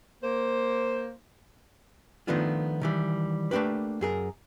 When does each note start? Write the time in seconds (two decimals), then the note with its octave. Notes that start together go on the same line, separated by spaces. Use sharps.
0.23 A#3 C5
2.27 D#3 F3 A3 B3 D4 F4
2.81 D#3 E3 G3
3.51 A3 A#3 D4 G4 B4
4.01 F#2 G#4 A#4